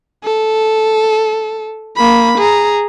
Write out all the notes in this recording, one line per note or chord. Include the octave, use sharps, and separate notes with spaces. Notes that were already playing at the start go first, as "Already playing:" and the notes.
A4
A#3 B5
G#4 A#5